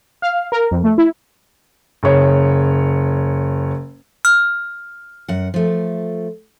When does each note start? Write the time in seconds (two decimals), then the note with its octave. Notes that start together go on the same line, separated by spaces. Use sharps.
0.22 F5
0.52 A#4
0.71 F2
0.84 A3
0.98 E4
2.03 F#1 C#5
4.25 F6
5.28 F#2 F#5
5.54 F3 A3